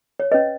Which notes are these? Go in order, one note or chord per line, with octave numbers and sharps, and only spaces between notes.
C#5
C#4 B4 D#5